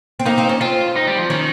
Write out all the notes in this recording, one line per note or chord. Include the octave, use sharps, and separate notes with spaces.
C4
A#3 D#4
C4
C#4
C4 F4
D#4
G3
F3
D#3 C#4